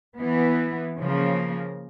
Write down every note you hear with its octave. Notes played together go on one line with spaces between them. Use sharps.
E3 B3
C#3 F3 A#3